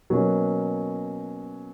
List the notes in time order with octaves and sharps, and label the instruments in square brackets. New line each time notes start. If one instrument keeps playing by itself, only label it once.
[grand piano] B2 F#3 A#3 C#4